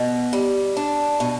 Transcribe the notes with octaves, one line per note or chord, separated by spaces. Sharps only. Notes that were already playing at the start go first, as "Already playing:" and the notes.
Already playing: B2
G3
D4
B2